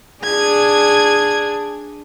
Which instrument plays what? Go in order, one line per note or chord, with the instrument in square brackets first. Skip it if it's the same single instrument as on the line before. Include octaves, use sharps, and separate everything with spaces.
[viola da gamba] D4 G#4 [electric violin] G#6